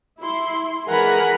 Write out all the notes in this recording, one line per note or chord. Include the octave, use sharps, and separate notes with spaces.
E4 C6
E3 G#3 A#4 F#5 G#5 B5